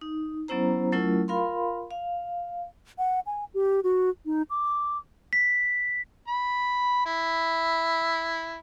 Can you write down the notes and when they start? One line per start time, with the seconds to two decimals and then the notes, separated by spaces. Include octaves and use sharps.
0.01 D#4
0.48 F#3 B3 C#4 E4 C5 A#5
0.92 F#3 A3 C#4 E4 F4 A#4
1.28 F4 A#4 F5 B5 C6
1.91 F5
2.98 F#5
3.26 G#5
3.54 G4
3.84 F#4
4.26 D#4
4.50 D6
5.33 B6
6.28 B5
7.06 E4